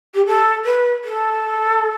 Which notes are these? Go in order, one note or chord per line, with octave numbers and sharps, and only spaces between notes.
G4
A4
B4
A4